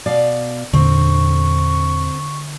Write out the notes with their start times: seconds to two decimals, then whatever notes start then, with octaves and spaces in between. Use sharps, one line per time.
0.06 B2 D5 F5
0.74 E2 A#2 D3 C4 D4 C#6